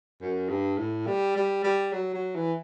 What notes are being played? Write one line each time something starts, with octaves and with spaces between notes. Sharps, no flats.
F#2
G2
A2
G3
G3
G3
F#3
F#3
E3